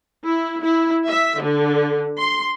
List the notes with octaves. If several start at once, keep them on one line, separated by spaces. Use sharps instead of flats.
E4
E4
E5
D3
C6